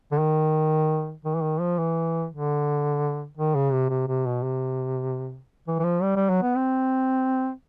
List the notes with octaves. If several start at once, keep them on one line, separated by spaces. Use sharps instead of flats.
D3
D#3
D#3
E3
D#3
F3
E3
D3
D#3
C#3
C3
C3
C3
B2
C3
E3
E3
F3
G3
G3
F#3
B3
C4